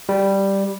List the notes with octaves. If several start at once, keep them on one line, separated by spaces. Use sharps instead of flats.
G3